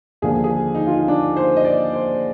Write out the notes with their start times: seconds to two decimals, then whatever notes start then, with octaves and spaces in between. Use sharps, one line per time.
0.22 D#2 D3 F3 G#4
0.44 G#4
0.75 D#4
0.87 F4
1.08 D4
1.37 C5
1.56 D#5
1.65 D5
1.93 C5